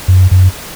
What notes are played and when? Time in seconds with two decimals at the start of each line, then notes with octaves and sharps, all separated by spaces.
0.08 F#2
0.31 F#2